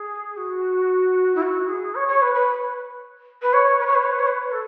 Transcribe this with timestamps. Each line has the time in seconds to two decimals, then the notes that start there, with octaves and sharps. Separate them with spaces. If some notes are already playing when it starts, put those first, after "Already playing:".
Already playing: G#4
0.37 F#4
1.35 E4
1.42 F#4
1.68 G#4
1.95 C#5
2.08 C#5
2.21 B4
2.34 B4
3.42 B4
3.53 C#5
3.79 B4
3.87 C#5
3.95 B4
4.03 C#5
4.11 B4
4.19 C#5
4.27 B4
4.52 A4